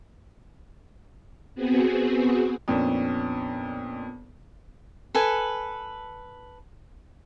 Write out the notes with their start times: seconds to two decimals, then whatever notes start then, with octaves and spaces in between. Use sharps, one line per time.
1.55 B3 C4 F#4 G#4
2.68 F2 A#2 B3 C#4 D4
5.14 A4 B4 G#5